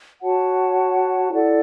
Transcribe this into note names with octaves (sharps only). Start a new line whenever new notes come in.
F#4 C#5 F#5 A5
E4 A4 D5 F#5